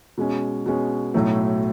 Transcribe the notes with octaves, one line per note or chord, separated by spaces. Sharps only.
B2 G#3 C#4
B2 G#3 C#4
B1 A2 F#3 A3